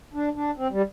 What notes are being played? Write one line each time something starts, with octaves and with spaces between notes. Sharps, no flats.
D4
D4
C4
G3